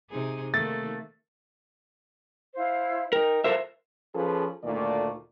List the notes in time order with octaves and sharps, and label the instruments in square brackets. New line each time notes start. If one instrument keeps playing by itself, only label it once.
[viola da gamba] C3 D#4 G#4
[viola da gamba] D#3 A#3 [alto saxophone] A3 [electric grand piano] A6
[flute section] E4 C5 F5
[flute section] D#4 G5 [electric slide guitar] A#4
[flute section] F4 A4 [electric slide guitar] A#4 C5 E5
[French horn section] F3 C#4 G#4 A4 B4
D2 A#2 D#3 A3 D5